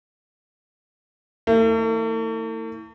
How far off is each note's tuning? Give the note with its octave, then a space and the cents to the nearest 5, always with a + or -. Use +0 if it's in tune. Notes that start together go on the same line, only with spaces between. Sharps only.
E3 -30 A3 +45